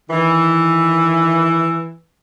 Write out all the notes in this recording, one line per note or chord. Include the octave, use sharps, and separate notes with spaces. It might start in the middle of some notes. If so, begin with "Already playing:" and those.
D#3 E3